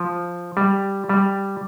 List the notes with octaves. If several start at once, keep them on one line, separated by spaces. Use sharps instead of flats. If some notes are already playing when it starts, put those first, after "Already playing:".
Already playing: F3
G3
G3